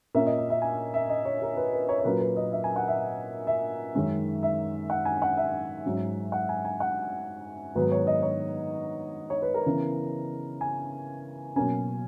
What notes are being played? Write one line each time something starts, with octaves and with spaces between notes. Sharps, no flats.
A#2 A#3 C#4 E5
D#5
D#5
E5
G#5
E5
D#5
C#5
A#4
B4
B4
C#5
C#5
A#2 F#3 A#3 C#4 B4
B4
D#5
E5
G#5
F#5
E5
E5
F#2 D#3 G#3 C#4
E5
F#5
G#5
F#5
E5
G#2 F#3 C#4
F#5
G#5
G#5
F#5
G#2 D#3 F#3 B3 B4
C#5
D#5
C#5
C#5
B4
A#4
C#3 E3 B3
G#5
B2 F#3 A#3 C#4 G#5